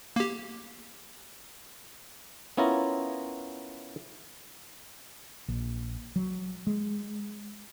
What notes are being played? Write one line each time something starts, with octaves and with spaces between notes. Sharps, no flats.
A#3 G4
B3 C#4 E4 F4 A#4
A#1
F#3
G#3